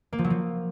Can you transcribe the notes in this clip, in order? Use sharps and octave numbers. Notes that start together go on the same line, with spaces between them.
A#3
F3
F#3
F3